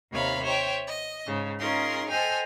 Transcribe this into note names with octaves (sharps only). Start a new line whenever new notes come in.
D#2 C3 D#3 C#5 F5 B5
C5 C#5 E5 G5
D#5
G#2 C#3
C#4 D#4 F4 G#4 A#4 C6
A4 C5 D#5 G5 G#5 F6